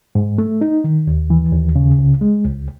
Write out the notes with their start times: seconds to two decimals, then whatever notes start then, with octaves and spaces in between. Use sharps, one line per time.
0.15 G#2
0.38 A3
0.61 D#4
0.84 D#3
1.07 D#2
1.30 E3
1.53 D#2
1.76 C#3
1.98 C#2
2.21 G#3
2.44 C#2